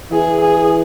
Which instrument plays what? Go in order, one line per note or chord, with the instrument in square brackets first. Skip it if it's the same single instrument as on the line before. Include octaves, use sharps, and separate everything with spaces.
[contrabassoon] E3 [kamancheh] G#4
[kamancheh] G#4